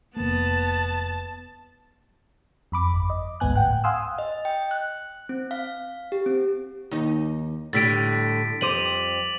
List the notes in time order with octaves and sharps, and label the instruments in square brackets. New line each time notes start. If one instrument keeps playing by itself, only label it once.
[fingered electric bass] F1 A#3 [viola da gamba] B3 [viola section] A5
[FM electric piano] F2 B5 D6
G1
D#5
G1 D2 G#2 B3 G#5 F#6
A2 F#5 G5 F#6
F5 F#5 G#5 C6 D#6 E6
[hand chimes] D#5
G5
F#6
C4
F5
G4
C4
[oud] D#2 D#4
[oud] A2 D3 G3 [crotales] A6 B6 D7
[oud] F2 G3 C5 [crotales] D6 D#7 F#7